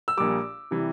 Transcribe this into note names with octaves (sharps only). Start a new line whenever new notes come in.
E6
A#1 A#2 G3 D6
C3 E3 G3